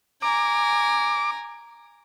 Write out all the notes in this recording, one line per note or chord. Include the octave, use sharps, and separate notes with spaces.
G#5 A#5 D6